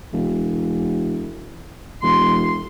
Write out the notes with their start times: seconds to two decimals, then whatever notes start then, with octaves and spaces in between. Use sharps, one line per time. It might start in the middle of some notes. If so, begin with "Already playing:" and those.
0.13 E1
2.03 E1 C6